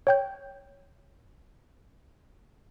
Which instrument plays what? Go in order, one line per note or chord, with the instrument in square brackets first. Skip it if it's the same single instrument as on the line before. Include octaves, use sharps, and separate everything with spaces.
[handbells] C#5 G5 G6